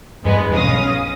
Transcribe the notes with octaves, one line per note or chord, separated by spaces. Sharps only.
E2 G2 G#3 B3
B1 C#4 F5 D#6 A#6